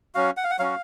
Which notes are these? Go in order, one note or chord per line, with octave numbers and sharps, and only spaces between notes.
F#3 C#4 F#4 F5
F#5
F5
F#5
F#3 C#4 F#4 F5